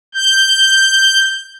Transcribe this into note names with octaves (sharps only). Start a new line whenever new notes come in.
G6